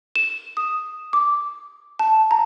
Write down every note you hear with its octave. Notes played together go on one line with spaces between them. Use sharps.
E7
D#6
D6
A5
A#5